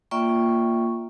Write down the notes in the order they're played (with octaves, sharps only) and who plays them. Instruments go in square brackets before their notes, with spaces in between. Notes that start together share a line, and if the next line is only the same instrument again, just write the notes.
[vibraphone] A#3 F4 D5 E5 G5 C#6